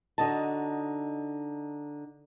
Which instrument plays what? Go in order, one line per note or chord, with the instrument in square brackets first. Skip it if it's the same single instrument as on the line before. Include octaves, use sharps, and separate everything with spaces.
[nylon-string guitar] D3 D#4 F#4 D#5 A5